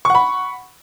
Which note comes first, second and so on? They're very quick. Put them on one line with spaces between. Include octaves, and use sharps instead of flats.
C#6 F#5 B5